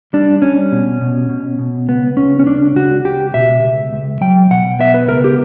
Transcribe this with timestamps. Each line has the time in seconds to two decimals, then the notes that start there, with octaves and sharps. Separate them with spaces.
0.13 G3 D4
0.42 G3 C#4
0.72 B2
1.01 B2
1.29 B2
1.59 B2
1.89 C#2 B3
2.17 C#2 C#4
2.40 C#4
2.47 C#2 D4
2.75 C#2 F#4
3.05 C#2 G4
3.34 B2 E5
3.63 C#2
3.93 C#2
4.21 F#3 G5
4.51 B2 F#5
4.79 B3 E5
4.94 B4
5.09 C#2 A#4
5.24 G4